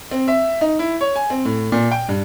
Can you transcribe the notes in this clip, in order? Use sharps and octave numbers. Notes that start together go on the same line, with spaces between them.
C4
E5
D#4
E4
C#5
G#5
C4
A2
A#2
G5
G2